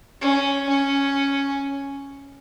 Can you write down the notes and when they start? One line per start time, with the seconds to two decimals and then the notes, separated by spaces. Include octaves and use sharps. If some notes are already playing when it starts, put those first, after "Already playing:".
0.21 C#4
0.69 C#4